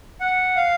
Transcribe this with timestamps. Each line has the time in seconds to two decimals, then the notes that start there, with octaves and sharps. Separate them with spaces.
0.20 F#5
0.56 F5